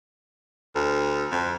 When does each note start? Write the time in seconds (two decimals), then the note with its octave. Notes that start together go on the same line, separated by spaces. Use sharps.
0.75 D2
1.32 F2